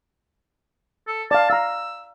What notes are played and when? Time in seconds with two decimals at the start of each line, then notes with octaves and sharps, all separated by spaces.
1.07 A4
1.31 D5 F5 A5
1.50 F5 A#5 E6